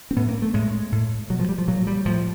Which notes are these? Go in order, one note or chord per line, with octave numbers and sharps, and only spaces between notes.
C4
A2 B3
A#3
A3
A2 G#3
A2
B2 F#3
F3
G3
F3
A#2 F#3
G3
A2 F3